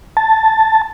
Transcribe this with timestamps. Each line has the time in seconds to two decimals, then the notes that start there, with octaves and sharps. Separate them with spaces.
0.17 A5